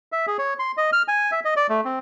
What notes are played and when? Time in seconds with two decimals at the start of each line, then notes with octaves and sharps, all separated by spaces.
0.12 E5
0.27 G#4
0.38 C#5
0.59 C6
0.77 D#5
0.93 F6
1.08 G#5
1.32 E5
1.45 D#5
1.56 D5
1.69 A3
1.85 C4